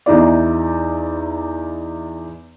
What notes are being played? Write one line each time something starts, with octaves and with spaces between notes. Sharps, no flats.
E2 D#4 E4 D5